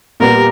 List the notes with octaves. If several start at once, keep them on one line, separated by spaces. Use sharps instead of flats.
A#2 G3 B3 G4 A#4